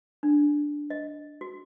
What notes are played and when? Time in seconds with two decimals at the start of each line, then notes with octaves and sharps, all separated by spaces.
0.23 D4
0.90 D#5
1.41 F#4